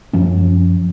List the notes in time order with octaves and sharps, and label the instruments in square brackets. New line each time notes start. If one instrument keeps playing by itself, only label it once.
[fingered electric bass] F#2 F3 C#4